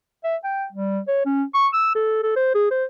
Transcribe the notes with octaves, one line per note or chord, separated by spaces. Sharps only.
E5
G5
G3
C#5
C#4
C#6
E6
A4
A4
C5
G#4
C5